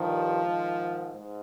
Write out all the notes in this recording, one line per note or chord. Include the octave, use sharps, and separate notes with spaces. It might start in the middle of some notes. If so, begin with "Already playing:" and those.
Already playing: G2 D#3 F3
G#2 D#3
G#2